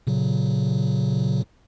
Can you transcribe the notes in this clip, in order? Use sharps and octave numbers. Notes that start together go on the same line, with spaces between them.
A#2 C#3 F#3